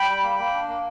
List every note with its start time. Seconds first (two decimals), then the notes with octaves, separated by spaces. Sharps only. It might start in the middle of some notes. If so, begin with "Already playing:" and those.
Already playing: G5 B5
0.09 G3
0.23 A#3
0.38 A#3
0.54 D4
0.69 A#3